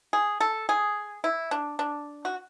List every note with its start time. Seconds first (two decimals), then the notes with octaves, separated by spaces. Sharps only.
0.13 G#4
0.40 A4
0.69 G#4
1.24 E4
1.51 D4
1.79 D4
2.25 F#4